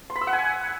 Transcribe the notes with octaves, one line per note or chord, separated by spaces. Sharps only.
C6
B5
E6
F#5
G#5